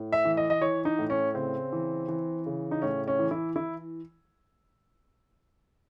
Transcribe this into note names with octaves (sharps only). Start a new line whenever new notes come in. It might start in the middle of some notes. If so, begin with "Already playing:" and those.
Already playing: A2
E5
E3
D#5
D#5
E3 C#5
D#4
A2
C#4
C#3 C4
E3
E3
C#3
D#4
A2 C#4
C#4
E3
E4
E3 E4